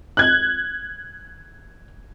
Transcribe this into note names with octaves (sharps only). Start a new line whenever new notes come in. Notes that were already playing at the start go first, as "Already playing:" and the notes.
F#6 G#6